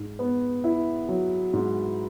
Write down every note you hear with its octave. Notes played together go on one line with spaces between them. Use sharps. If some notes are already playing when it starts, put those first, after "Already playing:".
Already playing: G#2
B3
E4
F#3
G#2